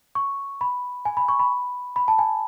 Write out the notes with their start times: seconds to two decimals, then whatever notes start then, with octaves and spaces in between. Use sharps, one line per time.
0.15 C#6
0.61 B5
1.05 G#5
1.17 B5
1.28 C#6
1.39 B5
1.96 B5
2.08 A5
2.19 G#5